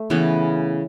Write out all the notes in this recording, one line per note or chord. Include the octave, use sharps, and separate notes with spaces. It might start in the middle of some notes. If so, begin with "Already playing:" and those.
Already playing: A3
C#3 E3 B3